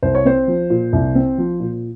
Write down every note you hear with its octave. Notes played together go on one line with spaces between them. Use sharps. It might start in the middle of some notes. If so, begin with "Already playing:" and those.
C2 C5
C#5
C4 C5
F3
A#2
C2
C4
F3
A#2